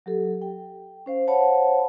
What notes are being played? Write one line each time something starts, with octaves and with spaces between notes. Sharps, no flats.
F#3 G4 A4
G5
C#4 C5 F5
C5 C#5 F5 F#5 A5 B5